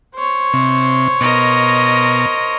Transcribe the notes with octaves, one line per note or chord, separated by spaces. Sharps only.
C5 C#5
C3
B2 A#4 D#5